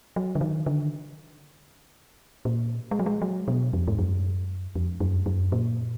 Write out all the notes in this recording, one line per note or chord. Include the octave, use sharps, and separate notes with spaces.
F#3
D3
D#3
D3
A#2
G#3
F#3
G#3
F#3
B2
F2
G#2
F#2
F2
F#2
F#2
A#2